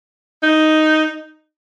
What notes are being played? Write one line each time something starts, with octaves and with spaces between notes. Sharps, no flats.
D#4